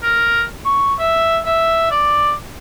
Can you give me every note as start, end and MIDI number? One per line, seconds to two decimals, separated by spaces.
0.02 0.42 70
0.65 0.94 85
0.99 1.38 76
1.45 1.88 76
1.91 2.32 74